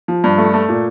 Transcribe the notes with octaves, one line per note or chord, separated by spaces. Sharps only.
F3
G2
A3
A3
A#2